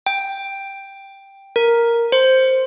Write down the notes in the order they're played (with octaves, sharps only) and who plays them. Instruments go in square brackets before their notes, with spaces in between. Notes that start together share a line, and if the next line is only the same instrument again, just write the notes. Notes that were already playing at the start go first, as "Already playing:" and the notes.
[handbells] G5
A#4
C5